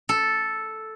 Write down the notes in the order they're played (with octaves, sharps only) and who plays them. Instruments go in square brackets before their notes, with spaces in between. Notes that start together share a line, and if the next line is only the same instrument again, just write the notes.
[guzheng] A4